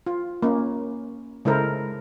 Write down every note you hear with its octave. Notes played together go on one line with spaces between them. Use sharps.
F4
A#3 C#4
C#3 G#3 E4 A4 A#4 C5